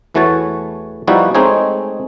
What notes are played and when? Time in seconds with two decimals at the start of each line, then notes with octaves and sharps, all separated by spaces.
0.14 E2 E3 A3 F#4 C#5 A5
1.07 F3 G3 B3 D#4 E4 F#4
1.35 G#3 A3 C4 D#4 G#4 C#5